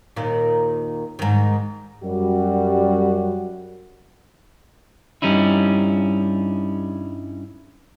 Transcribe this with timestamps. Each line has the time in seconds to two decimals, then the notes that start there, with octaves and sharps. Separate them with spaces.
0.16 D#2 A#2 D#3
1.19 G#2 D#3
2.03 F#2 G3 F#4
5.22 G2 G3 C#4 D#4 E4